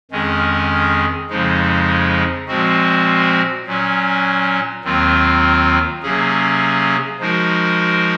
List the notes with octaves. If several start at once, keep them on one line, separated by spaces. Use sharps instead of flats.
F2 D#3 G#3 C#4 G#4
F2 C#3 F3 G#3 D#4
A#2 F3 G#3 C4 F#4
A#2 F#3 C#4
D#2 D#3 F#3 C4 F4
C3 F#3 A#3 C#4 G#4
F3 G#3 D#4 F#4 A#4